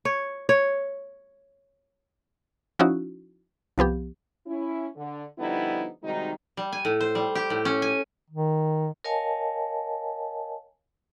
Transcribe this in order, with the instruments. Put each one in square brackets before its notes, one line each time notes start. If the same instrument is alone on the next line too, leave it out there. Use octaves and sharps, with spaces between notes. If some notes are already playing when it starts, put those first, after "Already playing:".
[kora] C#5
C#5
[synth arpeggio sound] F3 C#4 D#4 E4 F#4
C2 F3 B3 G4
[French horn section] C#4 E4
D3
D3 F3 G3 B3 D#4 E4
C3 D#3 G3 G#3 D#4 F#4
[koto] G3
G#5
A2
C5
G3
G4
A2
C#4
G#5
[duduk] D#3
[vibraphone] A#4 C#5 D#5 F5 G#5 A5